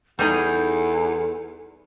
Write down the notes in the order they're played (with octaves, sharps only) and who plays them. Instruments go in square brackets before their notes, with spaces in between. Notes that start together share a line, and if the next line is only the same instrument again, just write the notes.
[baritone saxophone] E2 [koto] G3 D#4 G#4 [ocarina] A4